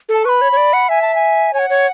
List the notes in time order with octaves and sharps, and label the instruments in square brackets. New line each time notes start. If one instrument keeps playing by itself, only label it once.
[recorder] A4 [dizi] A5
[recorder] B4 [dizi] B5 C#6
[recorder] C#5
C#5
D5
F#5
[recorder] E5 [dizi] G#5
[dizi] A5
G#5
[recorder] C#5 [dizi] G#5
[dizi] F#5
[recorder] C#5